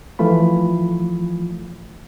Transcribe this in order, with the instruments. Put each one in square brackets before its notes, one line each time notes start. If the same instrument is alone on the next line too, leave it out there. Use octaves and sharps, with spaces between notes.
[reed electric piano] E3 F3 A3 F4 B5